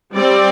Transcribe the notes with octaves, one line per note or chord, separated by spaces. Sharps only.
G3 C4 D5